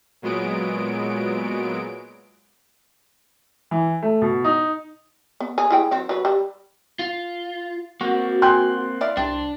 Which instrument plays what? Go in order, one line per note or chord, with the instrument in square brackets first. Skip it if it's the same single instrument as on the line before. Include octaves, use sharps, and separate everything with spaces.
[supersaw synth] A#2 F#3 G#3 B3 D7
[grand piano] E3
A3
B2
D#4
[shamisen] B3
G#4
E4 G#4 G5
D#3 F#3 C4
F#3 B4
G3
[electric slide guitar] F4
[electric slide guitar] A#3 C4 [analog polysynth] F#4
[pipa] G5 G#5 [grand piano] C6 F#6
[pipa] E4 D5 F5
[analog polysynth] C2 [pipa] C4 [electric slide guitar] D4